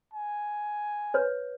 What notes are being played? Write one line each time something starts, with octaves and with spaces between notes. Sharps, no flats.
G#5
B4 C#5